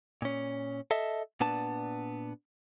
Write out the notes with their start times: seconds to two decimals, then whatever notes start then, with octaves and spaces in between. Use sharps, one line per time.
0.22 A#2 C#4
0.91 A4 D#5 E5 A5
1.40 A#2 B3 D4 A5